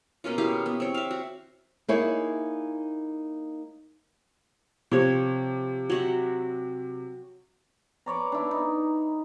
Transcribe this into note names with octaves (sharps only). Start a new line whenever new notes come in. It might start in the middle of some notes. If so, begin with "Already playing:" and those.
B2 A#3 C#4 F4
E4 G4 G#4 F5
B3
C4 C#5
E5 F5
F#4
A#3 D#4 E4 G#4 C#5
C3 F3 C#5
F#3 F#4 E5
B4 C#5 D5 A#5
D4 E4
D#4